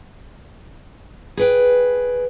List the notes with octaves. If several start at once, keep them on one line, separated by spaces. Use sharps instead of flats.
G#4 B4 G5